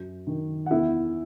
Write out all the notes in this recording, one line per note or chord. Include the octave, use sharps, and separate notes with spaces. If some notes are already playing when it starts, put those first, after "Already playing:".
Already playing: F#2
D#3
F#5
E2 E4 E5